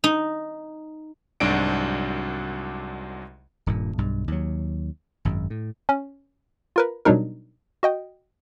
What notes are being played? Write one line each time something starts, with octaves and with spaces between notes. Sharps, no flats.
D#4
C2 G#2 F#3 D4 F#4 D7
D#1 G2 A#2
B1 G2
D#2 F#3
G#1 F#2
A2
C#4
F4 A#4 B4
B2 F#3 G3 D4 D#4 A#4
F#4 D#5 G5